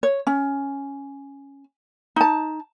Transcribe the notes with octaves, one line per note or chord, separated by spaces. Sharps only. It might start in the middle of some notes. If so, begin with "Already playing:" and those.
C#5
C#4
D#4 A5